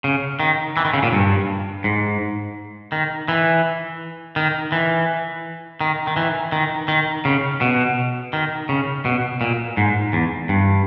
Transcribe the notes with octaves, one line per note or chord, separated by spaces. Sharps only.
C#3
D#3
E3
D#3
C#3
A#2
G2
G#2
D#3
E3
D#3
E3
D#3
D#3
E3
D#3
D#3
C#3
B2
D#3
C#3
B2
A#2
G#2
E2
G2